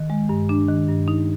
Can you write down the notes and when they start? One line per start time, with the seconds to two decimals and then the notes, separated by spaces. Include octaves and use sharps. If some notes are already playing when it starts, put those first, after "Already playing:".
Already playing: D#3
0.10 G#3
0.29 G2
0.49 D4
0.68 D#3
0.89 G2
1.08 D#4